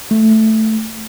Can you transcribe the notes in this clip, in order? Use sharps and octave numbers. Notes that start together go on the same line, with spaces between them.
A3